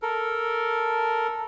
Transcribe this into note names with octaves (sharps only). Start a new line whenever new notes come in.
A4 A#4